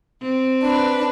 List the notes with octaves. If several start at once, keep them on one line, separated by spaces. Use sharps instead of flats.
C4
D4 B4